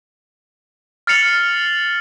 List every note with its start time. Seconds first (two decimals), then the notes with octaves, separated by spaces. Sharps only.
1.07 F6 A6 C7 C#7 F7 F#7